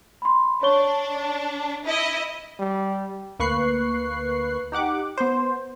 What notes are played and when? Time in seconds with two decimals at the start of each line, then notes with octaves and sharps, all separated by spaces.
0.22 B5 C6
0.63 D4 C#5 C#6 G7
1.86 E4 D#5
2.59 G3
3.39 D2 A#3 B4 C#6 F#6 C7
4.72 D#4 G4 F#5 D6
5.17 B3 C5